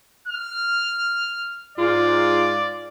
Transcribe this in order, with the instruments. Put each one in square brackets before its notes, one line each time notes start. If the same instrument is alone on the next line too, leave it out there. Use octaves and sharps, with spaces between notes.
[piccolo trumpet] F6
[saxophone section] G#2 F4 [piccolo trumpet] D5